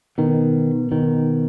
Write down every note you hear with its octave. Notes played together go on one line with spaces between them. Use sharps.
B2 D#3
B2 D#3